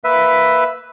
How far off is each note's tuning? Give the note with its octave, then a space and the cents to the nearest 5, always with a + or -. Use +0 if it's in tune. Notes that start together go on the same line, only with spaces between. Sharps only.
A#3 +0 B4 +5 E5 +0